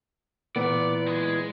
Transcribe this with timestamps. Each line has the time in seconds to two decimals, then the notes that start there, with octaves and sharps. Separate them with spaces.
0.56 A#2 E3 B3 D5
1.07 G#3